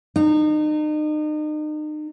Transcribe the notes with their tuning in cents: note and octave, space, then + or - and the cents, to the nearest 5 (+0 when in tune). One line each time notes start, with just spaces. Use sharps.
D#4 -35